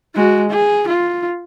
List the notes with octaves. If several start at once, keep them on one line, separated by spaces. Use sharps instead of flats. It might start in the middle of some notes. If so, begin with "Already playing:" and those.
G#3 F#4
G#4
F4